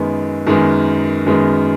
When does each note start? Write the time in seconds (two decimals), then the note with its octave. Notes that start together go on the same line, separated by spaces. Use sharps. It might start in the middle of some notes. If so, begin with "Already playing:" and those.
Already playing: F#2 D#3 G#3 B3
0.47 F#2 D#3 G#3 B3
1.26 F#2 D#3 G#3 B3